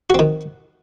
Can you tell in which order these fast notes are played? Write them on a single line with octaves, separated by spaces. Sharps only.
F#4 C4 D#3